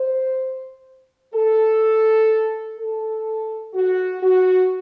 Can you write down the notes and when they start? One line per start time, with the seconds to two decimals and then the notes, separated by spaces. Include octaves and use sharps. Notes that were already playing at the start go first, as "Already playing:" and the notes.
Already playing: C5
1.34 A4
2.79 A4
3.74 F#4
4.22 F#4